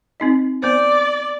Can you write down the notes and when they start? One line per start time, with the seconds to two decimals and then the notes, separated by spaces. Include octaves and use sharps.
0.20 C4 D#4 D#5
0.63 B3 C5 D5